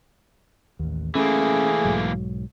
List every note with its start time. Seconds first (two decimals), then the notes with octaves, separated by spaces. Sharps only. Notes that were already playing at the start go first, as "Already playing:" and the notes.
0.79 A1 D#2
1.15 E3 A3 A#3 C#4 G#4
1.85 B1 G#2 F#3